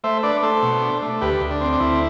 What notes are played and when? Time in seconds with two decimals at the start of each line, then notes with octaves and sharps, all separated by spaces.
0.04 A3 C5 E5
0.23 D4 B4 D5
0.43 A3 A4 C5
0.63 B2
0.82 D4
1.02 A3
1.21 D2 G4 B4
1.41 D2
1.51 D4
1.61 C4
1.72 D4
1.80 D2 E4